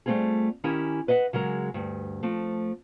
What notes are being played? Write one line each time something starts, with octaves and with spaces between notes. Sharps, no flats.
G3 A3 A#3 C4 F4 G#4
D#3 C#4 E4 G4 A#4 G#5
B4 D#5 E5 F#5
C#3 F#3 G#3 A#4
D2 G2
F3 A3 C4